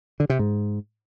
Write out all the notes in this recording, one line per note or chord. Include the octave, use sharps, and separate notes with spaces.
D3
C3
G#2